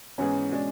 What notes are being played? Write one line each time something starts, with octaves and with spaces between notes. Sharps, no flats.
G#2 E3 B3 C#4 E4 G#4
B2 G#3 D4